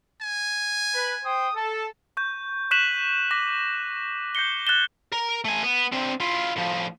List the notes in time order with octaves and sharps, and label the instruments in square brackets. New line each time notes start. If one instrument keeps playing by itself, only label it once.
[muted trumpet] G#5
[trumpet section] B4
C5 G5 D#6
A4
[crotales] C#6 G6
C#6 F#6 B6 D#7 E7 F#7
D6 A#6 B6
G6 A#6 C7 C#7 G7
F#6 A6 E7 G7
[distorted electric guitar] A#4
A3 G#5
B3
D3 C4
E4 F4
A2 F3